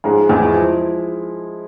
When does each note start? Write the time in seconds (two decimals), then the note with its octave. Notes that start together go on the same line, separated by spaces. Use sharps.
0.04 G#2 F3 G#3
0.29 E2 E3 G#3 E4 G#4
0.54 F3